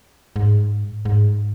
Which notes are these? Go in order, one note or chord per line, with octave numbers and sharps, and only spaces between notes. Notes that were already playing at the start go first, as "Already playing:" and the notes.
G#2
G#2